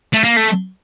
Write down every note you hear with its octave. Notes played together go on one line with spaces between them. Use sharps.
A3
A#3
A3